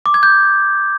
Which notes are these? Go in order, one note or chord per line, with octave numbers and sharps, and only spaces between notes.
D6
G#6
G6